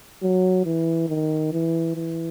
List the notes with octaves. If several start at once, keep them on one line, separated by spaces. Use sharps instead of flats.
F#3
E3
D#3
E3
E3